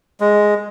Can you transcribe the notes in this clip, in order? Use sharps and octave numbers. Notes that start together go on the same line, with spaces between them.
G#3